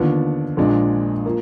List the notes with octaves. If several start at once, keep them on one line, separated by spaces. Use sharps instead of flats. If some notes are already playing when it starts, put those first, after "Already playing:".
Already playing: D#2 D3 F3 B3 D4
A#1 A#2 G#3 D4
F3 A#3